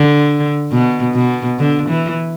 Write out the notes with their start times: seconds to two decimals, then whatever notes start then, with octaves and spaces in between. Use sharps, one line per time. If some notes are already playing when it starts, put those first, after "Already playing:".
Already playing: D3
0.71 B2
1.15 B2
1.59 D3
1.89 E3